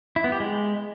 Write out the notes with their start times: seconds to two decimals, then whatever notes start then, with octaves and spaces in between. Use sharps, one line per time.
0.16 E4
0.24 B3
0.32 G4
0.40 G#3